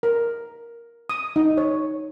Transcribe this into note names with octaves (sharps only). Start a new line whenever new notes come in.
A#4
D#6
D#4
C#5